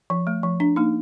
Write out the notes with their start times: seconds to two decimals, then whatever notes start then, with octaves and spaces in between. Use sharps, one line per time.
0.10 F3
0.27 A3
0.43 F3
0.60 D4
0.76 A#3 D#4